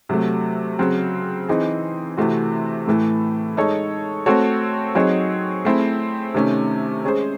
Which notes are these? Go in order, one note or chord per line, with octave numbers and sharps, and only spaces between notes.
C3 F#3 A3
C#3 F#3 C4
E3 C4 D#4 G#4
C3 E3 A3 C4 F#4
A2 E3 A3
G#3 D#4 A4 C#5
A3 C4 F#4 A4 C#5
F#3 C4 D#4 G#4 C#5
A3 C4 E4 G#4
C3 D#3 A3 C#4
G#3 C#4 G#4 C5